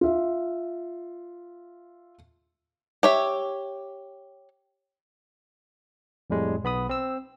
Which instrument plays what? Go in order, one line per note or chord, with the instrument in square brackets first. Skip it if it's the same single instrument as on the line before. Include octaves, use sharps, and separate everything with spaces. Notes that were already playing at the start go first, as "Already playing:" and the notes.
[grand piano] F4 E5
[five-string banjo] G4 C#5 E5
[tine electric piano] F2 A2 G3 G#3
B1 B3 B5 D#6
C4 E6